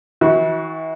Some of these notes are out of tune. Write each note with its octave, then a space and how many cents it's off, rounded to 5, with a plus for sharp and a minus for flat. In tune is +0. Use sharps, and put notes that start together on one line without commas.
E3 -40 F#4 +0